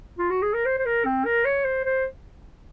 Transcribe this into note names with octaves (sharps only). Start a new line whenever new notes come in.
F4
F#4
G#4
A#4
C5
C5
A#4
C4
A#4
C#5
C5
C5